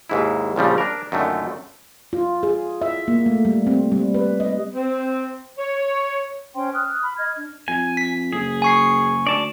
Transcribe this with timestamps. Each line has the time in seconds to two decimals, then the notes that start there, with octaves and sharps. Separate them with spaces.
0.10 D#2 G#2 E4
0.56 A#1 C#3 F3 G3
0.78 D4 A#4
1.12 F#2 A#2 D3 D#3 A3
2.13 F4
2.43 G#4
2.82 E5
3.08 A#3
3.26 A3
3.45 G3
3.67 C4
3.92 G3
4.14 B4
4.40 D#5
4.74 C4
5.59 C#5
6.54 C#4 C5 G5 C6
6.74 D#6 F6 F#6
7.01 B5
7.18 D#5 F6 G#6
7.35 D4
7.68 F2 G#5
7.97 B6
8.33 F#1 G#4
8.62 G#5 C#6 C7
9.27 D2 D5 A5